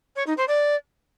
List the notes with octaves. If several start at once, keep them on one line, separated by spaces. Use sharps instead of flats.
C#5
D#4
C5
D5